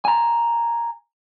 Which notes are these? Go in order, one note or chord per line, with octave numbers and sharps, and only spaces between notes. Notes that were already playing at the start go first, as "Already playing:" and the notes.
G#5 A#5